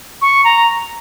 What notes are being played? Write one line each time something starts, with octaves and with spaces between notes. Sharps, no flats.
C#6
A#5